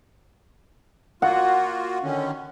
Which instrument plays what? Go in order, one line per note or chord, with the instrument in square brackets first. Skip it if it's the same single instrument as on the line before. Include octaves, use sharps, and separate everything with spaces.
[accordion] A#3 F4 F#4 [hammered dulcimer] F#5
[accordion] D3 D#3 C#4